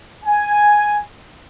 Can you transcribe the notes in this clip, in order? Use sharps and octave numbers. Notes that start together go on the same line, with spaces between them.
G#5